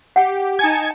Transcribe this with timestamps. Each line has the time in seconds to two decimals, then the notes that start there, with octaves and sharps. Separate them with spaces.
0.16 G4 F#5 G5
0.59 D#4 G#5 A5 C#7